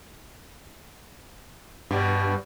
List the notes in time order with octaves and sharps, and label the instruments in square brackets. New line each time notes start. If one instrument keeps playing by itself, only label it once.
[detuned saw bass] G2 [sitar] B2 G3